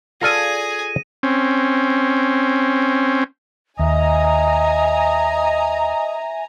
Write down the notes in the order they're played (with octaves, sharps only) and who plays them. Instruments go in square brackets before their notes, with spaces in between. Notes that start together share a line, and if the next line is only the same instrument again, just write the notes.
[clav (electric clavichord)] F4 A4 D5 [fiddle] G#4 G#5 [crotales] A#6 D#7
[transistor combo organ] C4 C#4
[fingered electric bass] D#2 [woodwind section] D#5 [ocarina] E5 [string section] G#5 A#5